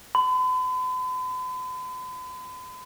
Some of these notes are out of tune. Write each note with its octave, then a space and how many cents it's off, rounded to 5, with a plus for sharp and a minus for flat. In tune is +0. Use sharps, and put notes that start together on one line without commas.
B5 +45